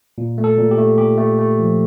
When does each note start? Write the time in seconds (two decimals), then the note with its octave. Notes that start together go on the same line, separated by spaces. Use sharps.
0.18 A#2
0.38 A3
0.44 A4
0.58 A#2
0.71 G4
0.78 A3
0.98 A#2 G4
1.18 A3
1.39 A3
1.59 F3